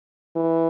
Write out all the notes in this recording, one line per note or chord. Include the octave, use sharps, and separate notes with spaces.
E3